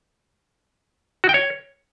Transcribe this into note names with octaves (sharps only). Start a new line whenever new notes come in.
F#4
G5
C#5